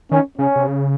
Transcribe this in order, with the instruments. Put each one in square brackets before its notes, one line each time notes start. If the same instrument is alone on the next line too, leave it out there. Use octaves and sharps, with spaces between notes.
[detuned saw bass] D#3 [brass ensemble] C#4
[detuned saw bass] C#3 [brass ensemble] C#4
[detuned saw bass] C3
C#3